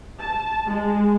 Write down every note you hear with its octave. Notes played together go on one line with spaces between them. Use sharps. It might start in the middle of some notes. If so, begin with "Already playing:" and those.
A5
G#3